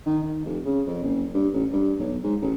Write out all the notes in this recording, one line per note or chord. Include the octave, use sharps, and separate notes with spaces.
D#3
D#3
F1
C#3
F2
F#1
G2
A1
G2
B1
G#2
A1